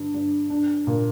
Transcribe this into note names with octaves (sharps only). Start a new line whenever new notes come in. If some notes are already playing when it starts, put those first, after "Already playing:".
Already playing: G2 D3
G2
D4
A#2